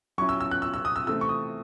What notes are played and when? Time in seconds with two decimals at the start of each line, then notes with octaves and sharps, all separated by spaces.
0.18 F#3 C#4 E4 C#6
0.29 E6
0.41 E6
0.51 F#6
0.62 E6
0.74 E6
0.85 D#6
0.96 E6
1.07 C3 E3 A3 C4 E6
1.21 C#6
1.29 D#6